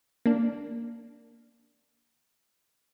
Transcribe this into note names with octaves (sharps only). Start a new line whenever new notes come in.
A#3 D4